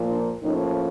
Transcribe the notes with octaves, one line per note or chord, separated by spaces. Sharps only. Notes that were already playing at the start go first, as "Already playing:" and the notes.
Already playing: A#2 F3 A#3
D4
A2 F3 A#3 C#4 D#4